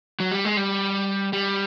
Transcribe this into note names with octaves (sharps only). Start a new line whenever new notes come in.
F#3
G3
G#3
G3
G3